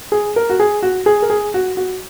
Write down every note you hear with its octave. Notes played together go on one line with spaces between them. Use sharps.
G#4
A#4
F#4
G#4
F#4
G#4
A#4
G#4
F#4
F#4